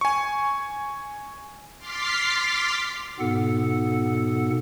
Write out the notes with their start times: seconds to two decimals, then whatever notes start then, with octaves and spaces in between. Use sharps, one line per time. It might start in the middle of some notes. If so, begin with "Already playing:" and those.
0.01 G#5 C#6
1.78 C6 D6 F6 A6 B6 C7
3.20 G#2 B2 B3 A4 F#5